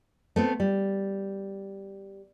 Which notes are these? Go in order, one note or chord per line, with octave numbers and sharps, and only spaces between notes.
A3 B3 C4
G3